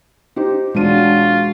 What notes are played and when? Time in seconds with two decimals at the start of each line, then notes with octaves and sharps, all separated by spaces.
0.36 D#4 G4 C5
0.75 E1 G#3 D4 F4 F#4 D#7